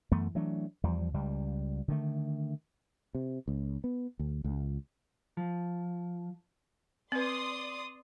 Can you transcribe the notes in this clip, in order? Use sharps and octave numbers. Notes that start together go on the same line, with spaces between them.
F#2 E3 A3 B3
E3 F#3 A3 D4
E2 F3 G3
C#2 G3
D3 D#3 A3
C3
C#2
B3
D2
C#2
F3
C4 B4 D5 C6 D#6